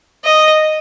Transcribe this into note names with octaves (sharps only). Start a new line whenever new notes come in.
D#5